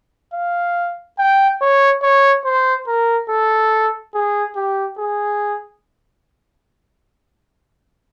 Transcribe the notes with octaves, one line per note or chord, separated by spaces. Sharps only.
F5
G5
C#5
C#5
C5
A#4
A4
G#4
G4
G#4